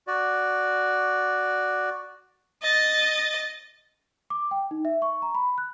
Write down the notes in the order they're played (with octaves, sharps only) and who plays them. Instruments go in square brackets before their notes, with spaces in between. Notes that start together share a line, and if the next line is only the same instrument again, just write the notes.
[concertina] F#4 D5
[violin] D#5 A6
[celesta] D6
G5
D#4
E5
C#6
A#5
B5
F#6